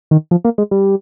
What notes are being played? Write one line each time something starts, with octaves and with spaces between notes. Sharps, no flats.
D#3
F3
A#3
G#3
G3